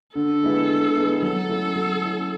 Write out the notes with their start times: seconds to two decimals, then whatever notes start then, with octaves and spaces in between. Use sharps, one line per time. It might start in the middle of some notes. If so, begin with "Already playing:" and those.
0.15 D3 A4
0.43 G#3 B3 E4
0.69 D3
0.96 G#3 B3 E4
1.22 F#3 A4
1.49 A3 C#4 E4
1.76 F#3
2.02 A3 C#4 E4